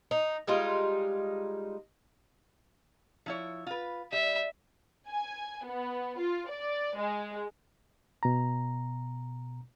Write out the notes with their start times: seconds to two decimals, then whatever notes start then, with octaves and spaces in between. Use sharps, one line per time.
0.11 D#4
0.47 G3 G#3 D#4 F4
3.26 F3 E4 C#5
3.67 F4 B4
4.12 G3 E5
5.09 G#5
5.66 B3
6.19 F4
6.50 D5
6.98 G#3
8.23 B2 A#5